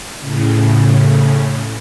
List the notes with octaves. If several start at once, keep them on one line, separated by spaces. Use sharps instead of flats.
A2 C#3